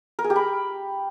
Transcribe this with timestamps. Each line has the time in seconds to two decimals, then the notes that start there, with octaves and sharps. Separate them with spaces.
0.19 A#4
0.24 G#4
0.30 G4
0.36 B5